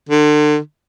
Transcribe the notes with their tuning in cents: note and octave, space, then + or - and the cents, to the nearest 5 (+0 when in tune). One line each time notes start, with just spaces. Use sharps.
D3 +35